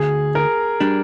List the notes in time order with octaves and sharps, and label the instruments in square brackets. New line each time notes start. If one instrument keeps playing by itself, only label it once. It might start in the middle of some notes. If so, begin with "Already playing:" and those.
Already playing: [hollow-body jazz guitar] D2 D3 [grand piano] G#4
[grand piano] A#4
[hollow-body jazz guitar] G3 D4